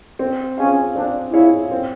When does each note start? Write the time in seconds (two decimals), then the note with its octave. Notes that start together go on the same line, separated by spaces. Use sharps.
0.19 C4
0.58 C#4 F4 G#4 C#5 F5
0.95 C4 D4
1.33 E4 F4 G#4 C#5 F5
1.71 C4